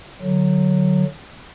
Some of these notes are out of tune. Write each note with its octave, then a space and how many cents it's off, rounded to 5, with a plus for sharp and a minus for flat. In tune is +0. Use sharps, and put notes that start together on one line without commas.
D3 +10 F#3 +0